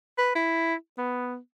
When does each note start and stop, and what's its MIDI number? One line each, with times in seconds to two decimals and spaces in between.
0.18 0.34 71
0.35 0.75 64
0.98 1.38 59